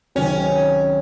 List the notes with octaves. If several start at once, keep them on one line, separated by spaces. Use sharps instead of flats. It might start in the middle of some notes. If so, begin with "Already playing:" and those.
C#2 C3 D#3 F#3 C#4